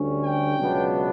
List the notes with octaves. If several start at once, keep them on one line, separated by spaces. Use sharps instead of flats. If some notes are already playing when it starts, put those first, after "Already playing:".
Already playing: D2 D3 G3 C#4
G5
C#2 B2 F#3 B3 D4